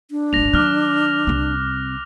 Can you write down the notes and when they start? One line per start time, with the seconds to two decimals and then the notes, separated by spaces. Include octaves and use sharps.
0.11 D4
0.33 D1 G#1 A#6 F7
0.53 D#3 F#3 D6 F6 F#6
1.27 C2 C4